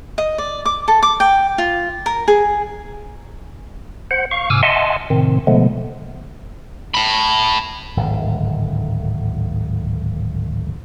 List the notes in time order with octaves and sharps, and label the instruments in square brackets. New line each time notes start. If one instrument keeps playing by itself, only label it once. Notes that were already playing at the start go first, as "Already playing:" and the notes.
[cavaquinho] D#5
D5
D6
A4
D6
G5
F4
A#4
G#4
[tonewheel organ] C5 F#5
F5 C#6
G#2 C3 G#5 D6 E6 F6
D#5 E5 F#5 G#5 A5 C6
A2 C3 D#3 C4
B2 D3 F3 G#3 A3 B3
[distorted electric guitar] A5 B5
[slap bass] D1 G#1 D3